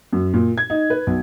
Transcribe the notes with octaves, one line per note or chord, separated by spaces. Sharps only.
F#2
A#2
G#6
D#4
B4
B1